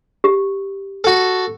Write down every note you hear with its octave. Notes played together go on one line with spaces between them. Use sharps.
G4
F#4 A4